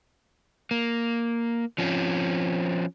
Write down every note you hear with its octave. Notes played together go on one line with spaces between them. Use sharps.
A#3
F3 C4 C#4